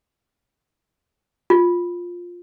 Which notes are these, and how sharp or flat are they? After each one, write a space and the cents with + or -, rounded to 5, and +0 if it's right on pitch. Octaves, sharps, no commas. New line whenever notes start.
F4 +10